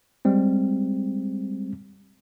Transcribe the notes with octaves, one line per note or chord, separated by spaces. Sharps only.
G3 G#3 C4